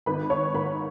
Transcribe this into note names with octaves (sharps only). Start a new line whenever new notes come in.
G#1 B4 B5
C#5 C#6
G#2 D#3 A#3 B4 B5